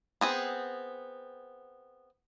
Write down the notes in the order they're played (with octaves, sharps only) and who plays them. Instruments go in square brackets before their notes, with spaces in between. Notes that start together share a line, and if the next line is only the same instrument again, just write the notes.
[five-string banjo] B3 C4 G#4